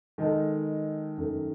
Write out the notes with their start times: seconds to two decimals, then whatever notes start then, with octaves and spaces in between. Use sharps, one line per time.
0.18 D#3 G#3 D#4 A4
1.17 F#2 D#3 A3